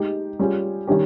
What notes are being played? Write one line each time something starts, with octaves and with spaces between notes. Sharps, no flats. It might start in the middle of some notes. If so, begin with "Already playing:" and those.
Already playing: G#3 D#4 G4
G3 C#4 F4 G#4
D#3 G3 C#4 G4